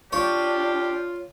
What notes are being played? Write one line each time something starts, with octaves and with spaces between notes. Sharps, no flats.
D4 F4 G4 C#5